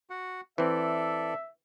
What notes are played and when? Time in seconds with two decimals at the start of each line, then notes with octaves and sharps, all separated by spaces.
0.10 F#4 F#5
0.58 E3 C4 A4 D5 E5